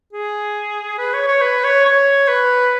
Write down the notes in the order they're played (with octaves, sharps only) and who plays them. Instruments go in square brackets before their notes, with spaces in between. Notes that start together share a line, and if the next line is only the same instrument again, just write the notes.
[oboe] G#4
B4
C#5
C#5
B4
C#5
C#5
B4